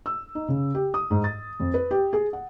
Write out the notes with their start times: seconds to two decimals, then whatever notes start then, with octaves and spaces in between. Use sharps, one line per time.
0.06 E6
0.35 D#4
0.48 C#3
0.75 G4
0.94 D#6
1.10 G#2
1.24 A6
1.60 F2
1.74 B4
1.91 G4
2.13 G#4
2.33 F#5